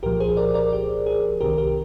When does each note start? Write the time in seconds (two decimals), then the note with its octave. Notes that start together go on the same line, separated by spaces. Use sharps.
0.03 C2 A#2 F3 G4 A#4
0.20 G#4 C5
0.37 A#4 D5
0.54 A#4 D5
0.73 G4
1.06 G#4
1.41 C2 C3 D#3 G4 A#4
1.58 G4 A#4